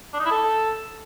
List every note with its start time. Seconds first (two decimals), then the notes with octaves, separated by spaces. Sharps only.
0.13 D4
0.19 D#4
0.25 E4
0.31 A4